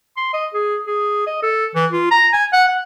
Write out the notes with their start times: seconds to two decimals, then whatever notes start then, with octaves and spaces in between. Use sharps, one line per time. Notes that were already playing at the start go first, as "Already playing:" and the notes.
0.17 C6
0.33 D#5
0.54 G#4
0.87 G#4
1.26 D#5
1.43 A4
1.75 E3
1.91 F4
2.11 A#5
2.33 G#5
2.53 F#5
2.68 F#5